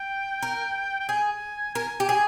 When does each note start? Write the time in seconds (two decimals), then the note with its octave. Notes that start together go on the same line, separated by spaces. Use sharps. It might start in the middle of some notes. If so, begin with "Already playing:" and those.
Already playing: G5
0.42 A#4
1.00 G5
1.09 G#4 G#5
1.75 A#4 G#5
2.00 G4
2.09 G#4